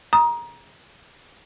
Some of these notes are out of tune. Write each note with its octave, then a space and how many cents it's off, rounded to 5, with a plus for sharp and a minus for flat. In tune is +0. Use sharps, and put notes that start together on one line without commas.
A#5 +25 D#6 +0